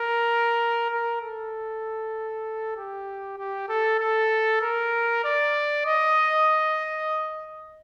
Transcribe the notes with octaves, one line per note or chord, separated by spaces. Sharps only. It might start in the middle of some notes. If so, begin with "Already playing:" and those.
Already playing: A#4
A#4
A4
G4
G4
A4
A4
A#4
D5
D#5